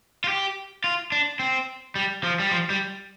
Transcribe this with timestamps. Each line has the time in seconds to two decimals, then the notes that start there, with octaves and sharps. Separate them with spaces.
0.24 F4
0.28 G4
0.84 F4
1.12 D4
1.39 C4
1.96 G3
2.24 F3
2.39 G3
2.51 F3
2.70 G3